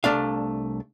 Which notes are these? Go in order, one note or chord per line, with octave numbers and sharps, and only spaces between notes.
C2 A3 D4 F5